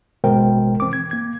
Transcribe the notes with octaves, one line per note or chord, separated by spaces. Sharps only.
G#1 B2 G#3 A#4 C5 G5
E3 C4 D6
G#6
A#3 G#6